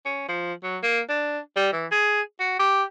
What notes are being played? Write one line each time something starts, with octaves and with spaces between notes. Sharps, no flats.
C#4
F3
F#3
A#3
D4
G3
E3
G#4
F#4
G4